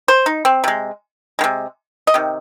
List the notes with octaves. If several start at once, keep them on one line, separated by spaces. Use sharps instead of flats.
C5
D#4
C4
C3 G#3
C3 D#3 G#3
D#5
C3 D#3